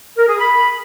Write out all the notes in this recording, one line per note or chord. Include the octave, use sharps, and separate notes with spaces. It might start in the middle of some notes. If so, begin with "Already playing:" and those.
A#4
G#4
B5